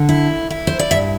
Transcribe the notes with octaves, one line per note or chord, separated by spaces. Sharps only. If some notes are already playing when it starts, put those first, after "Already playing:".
Already playing: D3
E4
E4
C5
D5
G2 E5